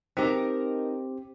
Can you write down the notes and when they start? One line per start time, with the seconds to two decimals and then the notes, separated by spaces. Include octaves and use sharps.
0.17 C4 D#4 G4 A#4 A5